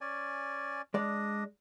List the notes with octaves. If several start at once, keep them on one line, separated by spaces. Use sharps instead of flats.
C#4 D5 G#5
G#3 D4 D5 D#5